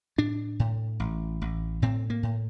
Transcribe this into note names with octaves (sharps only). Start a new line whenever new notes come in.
A2 D4
A2
A1
A1
A2 C4
A#3
A2